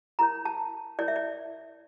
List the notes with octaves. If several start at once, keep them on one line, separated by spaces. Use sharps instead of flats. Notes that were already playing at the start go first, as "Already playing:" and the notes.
E4 A#4 C#5 A#5
A5
E4 A#4 C#5 D5
E5
D5